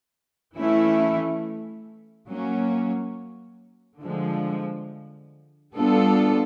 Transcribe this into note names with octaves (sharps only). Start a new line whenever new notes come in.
E3 A3 C#4 E4
F#3 A#3 C#4
D3 F3 G#3
G3 B3 D4 F4 A4